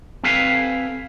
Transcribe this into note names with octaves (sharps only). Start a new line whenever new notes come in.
C4 G4 A4 B4 F5 G#5